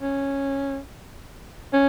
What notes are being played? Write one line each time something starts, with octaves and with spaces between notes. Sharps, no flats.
C#4
C#4